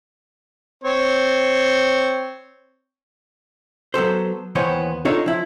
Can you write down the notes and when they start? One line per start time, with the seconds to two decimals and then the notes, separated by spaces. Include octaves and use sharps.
0.84 C4 C#5
3.94 F#3 B3 A4 C5
4.55 D#2 E3 B3 C5 C#5
5.05 D4 D#4 F4 A4 C#5
5.26 F3 E4